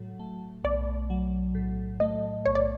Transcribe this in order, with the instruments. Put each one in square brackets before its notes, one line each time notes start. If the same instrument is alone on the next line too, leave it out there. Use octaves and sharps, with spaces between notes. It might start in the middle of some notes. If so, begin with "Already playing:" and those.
Already playing: [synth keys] A2 F#3
A3
[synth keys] B1 [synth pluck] D5
[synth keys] F#3
A2
[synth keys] A3 [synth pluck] D#5
[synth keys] B1 [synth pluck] C#5
[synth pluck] D5